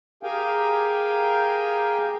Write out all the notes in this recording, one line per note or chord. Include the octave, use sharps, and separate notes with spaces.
G4 G#4 A#4 F5 G5 G#5